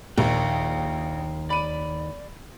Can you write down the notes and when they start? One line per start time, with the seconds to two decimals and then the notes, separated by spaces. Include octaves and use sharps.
0.18 A#1 D#2 F5 G5
1.50 D5 B5 D#7